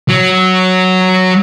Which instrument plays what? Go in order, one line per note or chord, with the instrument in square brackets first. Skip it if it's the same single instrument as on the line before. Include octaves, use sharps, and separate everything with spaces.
[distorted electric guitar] F#3